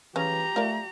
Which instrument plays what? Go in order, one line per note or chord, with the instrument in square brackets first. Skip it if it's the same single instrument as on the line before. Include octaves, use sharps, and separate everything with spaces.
[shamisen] C#3 C#4 [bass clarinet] E3 [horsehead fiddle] G4 A#5
[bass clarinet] A3 [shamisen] F4 A#4 D5